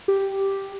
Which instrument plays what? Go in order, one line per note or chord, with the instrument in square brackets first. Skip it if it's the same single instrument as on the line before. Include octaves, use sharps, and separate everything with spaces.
[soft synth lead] G4